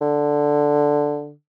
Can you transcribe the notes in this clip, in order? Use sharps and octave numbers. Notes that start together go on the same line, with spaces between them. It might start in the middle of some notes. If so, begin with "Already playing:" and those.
D3